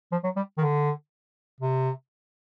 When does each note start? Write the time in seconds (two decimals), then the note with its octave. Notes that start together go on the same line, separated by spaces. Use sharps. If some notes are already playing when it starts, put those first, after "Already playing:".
0.12 F3
0.24 F#3
0.36 G3
0.58 D#3
0.61 D3
1.60 C3